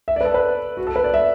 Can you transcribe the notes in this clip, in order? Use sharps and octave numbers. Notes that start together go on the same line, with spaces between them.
E5
D5
B4
A4
B4
F#4
A4
B4
D5
E5